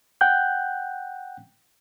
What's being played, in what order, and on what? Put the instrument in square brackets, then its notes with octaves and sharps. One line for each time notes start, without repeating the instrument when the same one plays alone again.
[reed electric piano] F#5 G5 F#6 G6